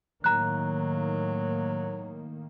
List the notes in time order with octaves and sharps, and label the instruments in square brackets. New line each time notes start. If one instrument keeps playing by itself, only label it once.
[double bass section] A2 D#3 A#3 [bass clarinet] F#3 [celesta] A#5 F#6